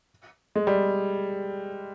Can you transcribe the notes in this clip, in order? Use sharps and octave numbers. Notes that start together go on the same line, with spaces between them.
G#3
G3